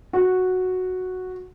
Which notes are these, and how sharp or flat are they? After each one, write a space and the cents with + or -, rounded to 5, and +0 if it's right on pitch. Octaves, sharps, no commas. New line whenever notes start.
F#4 -5